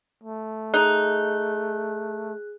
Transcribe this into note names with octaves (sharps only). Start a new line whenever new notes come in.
A3
D#4 G#4 F#6